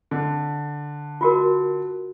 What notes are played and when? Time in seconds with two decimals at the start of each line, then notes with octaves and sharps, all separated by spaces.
0.11 D3
1.21 F4 F#4 A#4